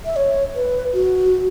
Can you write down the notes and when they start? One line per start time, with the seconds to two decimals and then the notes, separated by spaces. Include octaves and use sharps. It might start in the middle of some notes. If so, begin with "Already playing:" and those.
0.05 E5
0.16 C#5
0.55 B4
0.94 F#4